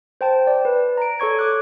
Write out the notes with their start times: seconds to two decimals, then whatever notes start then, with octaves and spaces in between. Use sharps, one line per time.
0.21 C5 G5 A5
0.47 D5
0.65 B4
0.97 A#5 D7
1.20 A4 C#5 C#6 G#6
1.39 D6 F#6